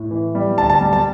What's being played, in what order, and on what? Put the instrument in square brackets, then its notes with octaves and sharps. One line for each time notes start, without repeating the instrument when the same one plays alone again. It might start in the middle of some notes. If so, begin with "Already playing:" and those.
Already playing: [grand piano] A2
E3
G3
D2 A5
A5
G3
A5